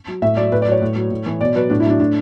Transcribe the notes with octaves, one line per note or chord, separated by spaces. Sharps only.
F#3
A2 E5
F#3 D5
A2 B4
D5
F#3 C#5
A2
F#3
A2
E3
B2 D5
F#3 B4
A2 D4
E4
F#3 D4
A2 D4